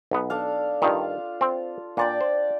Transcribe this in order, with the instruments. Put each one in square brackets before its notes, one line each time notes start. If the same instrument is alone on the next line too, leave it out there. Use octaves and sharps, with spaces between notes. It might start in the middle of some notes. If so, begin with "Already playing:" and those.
[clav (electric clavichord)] B1 B3
[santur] D4 A4 F5
[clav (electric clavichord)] G2 D#3 [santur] F4 F5
[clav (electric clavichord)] C4 C5
[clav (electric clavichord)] A#2 [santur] D4 D5 G5
[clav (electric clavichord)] C5